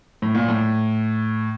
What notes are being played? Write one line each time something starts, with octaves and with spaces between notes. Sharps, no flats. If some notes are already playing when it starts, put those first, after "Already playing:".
A2
A#2
A2